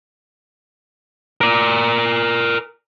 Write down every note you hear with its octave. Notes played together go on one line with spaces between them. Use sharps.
A#4 D5